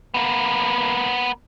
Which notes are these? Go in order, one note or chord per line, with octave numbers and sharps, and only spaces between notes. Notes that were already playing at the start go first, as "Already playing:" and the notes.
A#3 B3